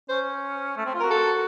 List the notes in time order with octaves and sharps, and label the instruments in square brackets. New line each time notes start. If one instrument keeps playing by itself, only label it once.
[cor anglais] C#4 [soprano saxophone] C5
[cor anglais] A3
C4
F4
[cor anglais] F#4 [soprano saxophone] A#4
[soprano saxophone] A4